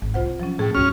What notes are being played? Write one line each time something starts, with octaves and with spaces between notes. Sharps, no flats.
G#1
C2 F4 C5 F#5
C3
F3 F#3 C#4
A2 G#4 G5
C2 G2 C#4 F#4 F6